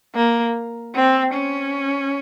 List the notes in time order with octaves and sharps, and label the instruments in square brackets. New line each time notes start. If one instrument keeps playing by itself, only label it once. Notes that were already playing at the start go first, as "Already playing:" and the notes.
[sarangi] A#3
C4
C#4